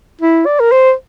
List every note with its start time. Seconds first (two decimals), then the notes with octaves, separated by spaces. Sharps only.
0.21 E4
0.46 D5
0.60 A#4
0.72 C5